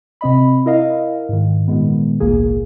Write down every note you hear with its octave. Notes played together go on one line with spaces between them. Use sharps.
C3 C4 D#5 B5
E4 A#4 D#5 F5
G#2 D#3
A#2 D#3 G#3 B3
G#1 C#2 A#2 A#3 G#4